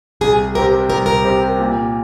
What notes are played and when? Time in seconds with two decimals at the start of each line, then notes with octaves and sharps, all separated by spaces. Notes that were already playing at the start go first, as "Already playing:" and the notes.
0.21 C2 G#4
0.55 C3 G3 C4 G4 A#4
0.89 C2 A#4
1.06 A#4
1.25 C3 G3 C4 G4
1.59 A#2